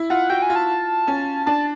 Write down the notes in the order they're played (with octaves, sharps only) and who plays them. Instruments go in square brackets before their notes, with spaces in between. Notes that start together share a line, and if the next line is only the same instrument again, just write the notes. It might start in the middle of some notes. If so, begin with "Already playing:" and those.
Already playing: [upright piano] E4
[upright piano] F4 [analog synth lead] F#5
[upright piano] F#4 [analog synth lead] G5
[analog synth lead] G#5
[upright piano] F4
[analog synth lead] A5
[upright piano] C#4
[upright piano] D4 [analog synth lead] A5